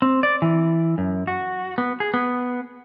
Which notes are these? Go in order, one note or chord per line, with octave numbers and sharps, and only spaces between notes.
C4
D5
E3
F#2
F#4
B3
G#4
B3